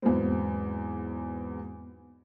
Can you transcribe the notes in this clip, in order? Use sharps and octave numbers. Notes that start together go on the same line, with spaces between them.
E2 G#2 F#3 B3 C4